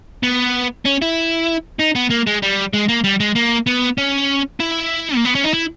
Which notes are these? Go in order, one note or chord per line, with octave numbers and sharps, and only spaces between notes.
B3
C#4
E4
D#4
B3
A#3
G#3
G3
G#3
A#3
G3
G#3
A#3
B3
C#4
E4
A#3
B3
C#4
D#4
E4